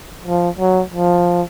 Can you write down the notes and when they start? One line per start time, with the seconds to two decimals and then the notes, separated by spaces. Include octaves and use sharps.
0.25 F3
0.59 F#3
0.94 F3